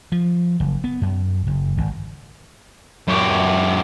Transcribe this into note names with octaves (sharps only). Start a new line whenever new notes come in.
F3
F#1
B3
F#2
F#1
G#1
F#2 G4